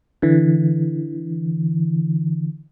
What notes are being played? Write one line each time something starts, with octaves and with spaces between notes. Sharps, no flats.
D3 E3